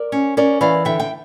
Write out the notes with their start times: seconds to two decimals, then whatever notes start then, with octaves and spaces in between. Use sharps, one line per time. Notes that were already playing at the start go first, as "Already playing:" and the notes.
Already playing: A#4 D5
0.12 C#4
0.37 C#4 A#4 D5
0.61 E3 D5 F5
0.85 D3 E5 G5
1.00 G5